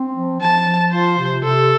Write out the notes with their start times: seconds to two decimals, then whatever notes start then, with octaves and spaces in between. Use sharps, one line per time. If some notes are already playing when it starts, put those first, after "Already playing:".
Already playing: C4
0.15 F3
0.40 F3 A5
0.66 F3
0.92 F4 C5
1.18 C3
1.44 C3 A4